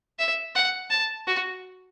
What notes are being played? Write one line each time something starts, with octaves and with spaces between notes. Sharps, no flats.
E5
F#5
A5
F#4